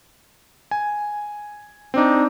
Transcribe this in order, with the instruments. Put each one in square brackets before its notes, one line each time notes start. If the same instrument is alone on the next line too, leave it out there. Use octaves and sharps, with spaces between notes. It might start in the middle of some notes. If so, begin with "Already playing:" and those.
[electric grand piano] G#5
[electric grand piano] C4 D#4 [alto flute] D4